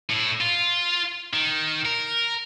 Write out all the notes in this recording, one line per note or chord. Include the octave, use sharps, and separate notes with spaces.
A2 E4
F4
D#3
A#4